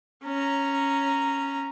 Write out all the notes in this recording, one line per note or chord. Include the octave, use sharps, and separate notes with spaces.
C#4 A#5